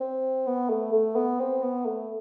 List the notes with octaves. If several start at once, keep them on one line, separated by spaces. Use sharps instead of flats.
C4
B3
A3
A3
B3
C4
B3
A3